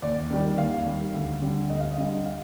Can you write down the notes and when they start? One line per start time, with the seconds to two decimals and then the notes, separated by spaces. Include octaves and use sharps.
0.02 D#2 D5
0.30 D#3 G3
0.58 D#2 F5
0.86 D#3 G3
1.13 D2
1.42 D3 G3
1.70 D2 D#5
1.80 F5
1.91 D#5
1.97 D3 G3
2.25 F5